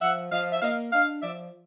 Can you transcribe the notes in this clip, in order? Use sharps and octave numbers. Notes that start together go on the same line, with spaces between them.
F3 E5 F#5
F3 D#5 F5
E5
A#3 D#5 F5
D4 D#5 F5
F3 D5 E5